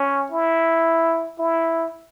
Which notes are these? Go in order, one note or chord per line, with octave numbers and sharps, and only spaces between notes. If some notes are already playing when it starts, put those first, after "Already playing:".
Already playing: C#4
E4
E4